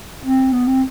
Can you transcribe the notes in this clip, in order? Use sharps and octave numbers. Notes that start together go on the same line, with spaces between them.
C4
B3
C4